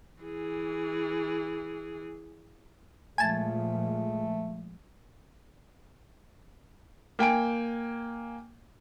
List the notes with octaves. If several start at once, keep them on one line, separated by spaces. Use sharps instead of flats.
E3 G#4
A#2 F3 G#3 A3 G#5 A5
A#3 G5 G#5 D7